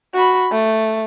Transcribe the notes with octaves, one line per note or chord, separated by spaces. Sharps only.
F#4 B5
A3